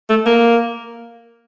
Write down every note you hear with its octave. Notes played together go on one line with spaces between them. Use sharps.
A3
A#3